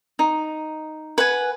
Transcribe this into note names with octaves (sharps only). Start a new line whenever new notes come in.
D#4
B4 F#5 G#5